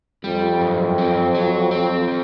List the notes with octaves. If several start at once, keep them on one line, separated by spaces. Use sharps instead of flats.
F2 G3
F#2
C4
F#3
C4
F3